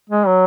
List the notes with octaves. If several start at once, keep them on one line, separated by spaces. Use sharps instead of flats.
G#3
F#3